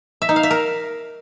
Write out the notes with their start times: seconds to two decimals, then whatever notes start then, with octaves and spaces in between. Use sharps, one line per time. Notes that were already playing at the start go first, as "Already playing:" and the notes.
0.22 E5
0.29 D#4
0.36 F5
0.43 E5
0.51 A#4